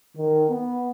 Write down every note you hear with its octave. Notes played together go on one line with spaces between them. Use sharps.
D#3
B3